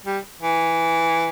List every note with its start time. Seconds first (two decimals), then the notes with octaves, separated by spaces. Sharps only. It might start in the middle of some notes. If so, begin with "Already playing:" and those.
0.05 G3
0.41 E3